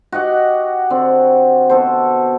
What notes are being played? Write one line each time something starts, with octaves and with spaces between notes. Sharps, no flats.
F#4 G4 D#5 F#5
D3 C4
B2 A4 C5